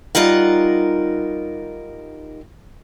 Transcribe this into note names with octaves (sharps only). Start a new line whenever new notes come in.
G3 D#4 F4 A#4 F#5